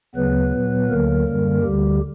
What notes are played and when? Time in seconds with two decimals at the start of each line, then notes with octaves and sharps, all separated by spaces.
0.15 D2 C#3 F#3 B3 B4
0.52 A#2 F#3
0.89 D2 D3 F#3 A#3 A#4
1.26 F#2 D3 G3
1.62 D2 D3 G3 G4